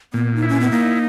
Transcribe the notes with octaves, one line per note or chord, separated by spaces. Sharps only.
A#2 B3
D#4
E4
C#4
B3
A#3 D#4